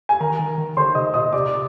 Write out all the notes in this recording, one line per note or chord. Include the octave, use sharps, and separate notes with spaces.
G#5
D#3 A#4 A#5
D#3
D#3
D3 C5 C6
C3 D#5 D#6
A#2 D#5 D#6
C3 D5 D6